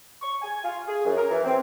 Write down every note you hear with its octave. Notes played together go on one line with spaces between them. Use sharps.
C#6
G#5
F4
G#4
F#2
A#4
E3
C4